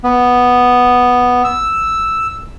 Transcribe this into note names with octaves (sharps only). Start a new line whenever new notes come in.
B3
E6